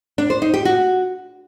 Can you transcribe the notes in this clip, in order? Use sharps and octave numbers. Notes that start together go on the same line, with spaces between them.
D4
C5
D#4
G4
F#4